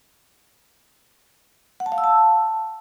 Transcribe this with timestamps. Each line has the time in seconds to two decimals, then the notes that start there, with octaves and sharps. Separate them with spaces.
1.80 F#5
1.86 A5
1.92 F5
1.98 E6
2.04 A5